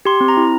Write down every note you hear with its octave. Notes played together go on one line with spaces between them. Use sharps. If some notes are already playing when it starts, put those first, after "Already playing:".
G4 C6
C4
A#5
E4